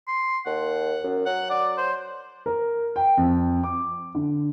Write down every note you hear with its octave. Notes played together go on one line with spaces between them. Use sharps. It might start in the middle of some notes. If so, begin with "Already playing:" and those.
C6
D#2 F#5
F#2
F#3 F#5
D5
C5
A#4
G5
F2
D6
D3